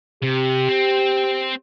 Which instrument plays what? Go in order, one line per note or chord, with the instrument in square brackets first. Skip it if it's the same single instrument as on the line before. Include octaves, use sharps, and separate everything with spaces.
[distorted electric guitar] C3 [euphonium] G4
[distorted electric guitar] C4